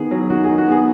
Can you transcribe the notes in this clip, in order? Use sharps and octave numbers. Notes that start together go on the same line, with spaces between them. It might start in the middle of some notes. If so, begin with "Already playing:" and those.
Already playing: D#3 B3 G#4
F#3
D#3 F#4
D#3 G#4
F#4
B3 G#4